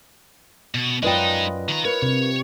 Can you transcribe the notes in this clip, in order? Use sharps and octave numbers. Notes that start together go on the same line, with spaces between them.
B2
F#2 G#3 D#4 F4 B4 D5 D#5 G5
D#3 A#5
A#4 B4 C#5
C3